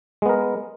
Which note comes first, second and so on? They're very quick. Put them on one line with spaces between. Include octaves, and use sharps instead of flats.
G#3 B3 A#4